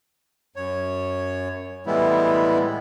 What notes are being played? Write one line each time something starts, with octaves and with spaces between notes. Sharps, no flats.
F#2 C#5
A2 E3 G3 G#3 B3 E4